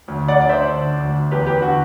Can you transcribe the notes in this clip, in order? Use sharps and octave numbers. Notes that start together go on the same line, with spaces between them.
D2
D5 F#5
D3 D5
C5 E5
D3
D2
E2 G4 B4
G4 B4
D3 F#4